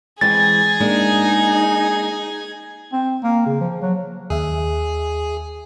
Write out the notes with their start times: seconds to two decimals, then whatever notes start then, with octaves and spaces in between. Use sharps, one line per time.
0.21 E3 G#3 C4 G#4 G#5 A6
0.80 G#3 A#3 D4 D#4
2.93 C4
3.23 A#3
3.46 C#3
3.60 F3
3.82 F#3
4.30 D#2 G#4 E5